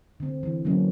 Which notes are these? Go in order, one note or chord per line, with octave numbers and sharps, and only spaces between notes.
D3 C4
E3
D3 F#3 A#3 C#4